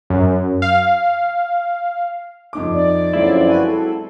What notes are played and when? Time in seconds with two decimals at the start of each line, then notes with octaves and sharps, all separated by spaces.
0.10 F#2
0.62 F5
2.53 F2 D#4 D6
2.72 D5
3.13 F#2 D3 F3 F#3 G#3 C4 E4
3.48 F#4 B4 G#5
3.64 A4